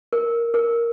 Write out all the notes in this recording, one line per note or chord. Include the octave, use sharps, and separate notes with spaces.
A#4
A#4